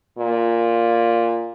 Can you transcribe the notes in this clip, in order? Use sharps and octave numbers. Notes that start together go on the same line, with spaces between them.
A#2